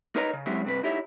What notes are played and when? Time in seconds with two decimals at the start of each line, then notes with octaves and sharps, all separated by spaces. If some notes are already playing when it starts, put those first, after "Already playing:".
0.16 D#4 A#4 B4 C#5 D#5 A#5
0.33 C#3
0.46 F#3 G#3 C4 C#4 E4 G4
0.65 G2 C3 B4
0.83 D#4 E4 G4 C#5 E5